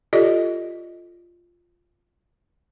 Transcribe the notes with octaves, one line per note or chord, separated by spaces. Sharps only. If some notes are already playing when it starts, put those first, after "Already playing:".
F4 G4 A4 D5 D#5